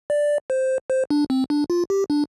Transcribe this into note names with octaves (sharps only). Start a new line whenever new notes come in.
D5
C5
C5
D4
C4
D4
F4
G4
D4